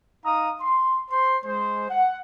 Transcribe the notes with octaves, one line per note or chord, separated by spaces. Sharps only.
D#4 F5 A#5 D#6
C6
C5 C6
G#3 C5
F#5